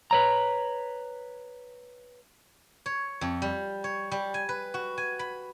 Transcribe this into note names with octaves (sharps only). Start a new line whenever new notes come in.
B4 C#5 A#5
C#5
F2
G3
C#5
G3
G#5
B4
F#4
G#5
B5